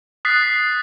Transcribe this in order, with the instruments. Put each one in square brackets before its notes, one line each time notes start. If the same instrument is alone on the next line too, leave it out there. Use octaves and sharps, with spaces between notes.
[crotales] D#6 F#6 A6 B6 C7